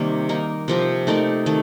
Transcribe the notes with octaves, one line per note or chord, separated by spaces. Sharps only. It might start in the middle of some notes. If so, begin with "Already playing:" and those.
Already playing: C3 D#3 G3 A#3 C4
A#3 D#4 A#4
C3 F3 C4
A3 D#4 A#4 D5
D#3 A3